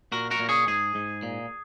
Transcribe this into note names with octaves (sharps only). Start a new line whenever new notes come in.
A#2 F#4 A#4
F#4 A#4
A#2
G#4 C#5
G#2 G#4
G#2
A#2